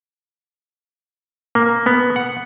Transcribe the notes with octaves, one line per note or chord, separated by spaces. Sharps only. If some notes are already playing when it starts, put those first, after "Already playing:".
A#3
B3
F#5